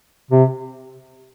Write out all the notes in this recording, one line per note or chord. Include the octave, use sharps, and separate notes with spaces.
C3